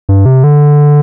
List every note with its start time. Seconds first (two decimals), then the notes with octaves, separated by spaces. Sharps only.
0.09 G2
0.26 C3
0.44 D3